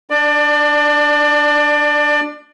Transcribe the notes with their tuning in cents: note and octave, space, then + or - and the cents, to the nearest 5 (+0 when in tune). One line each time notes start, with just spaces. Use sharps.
D4 +0 D5 +25